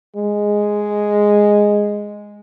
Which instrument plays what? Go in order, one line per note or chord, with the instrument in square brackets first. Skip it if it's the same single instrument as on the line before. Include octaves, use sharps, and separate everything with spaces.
[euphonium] G#3